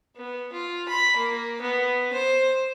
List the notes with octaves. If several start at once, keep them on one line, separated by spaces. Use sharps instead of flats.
B3
F4
B5
A#3
B3
C5